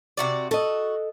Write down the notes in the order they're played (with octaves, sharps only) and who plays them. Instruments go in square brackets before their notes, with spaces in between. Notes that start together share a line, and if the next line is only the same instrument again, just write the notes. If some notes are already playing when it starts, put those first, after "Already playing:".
[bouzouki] C3 F#4 D5
[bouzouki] F#4 [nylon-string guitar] A4 D#5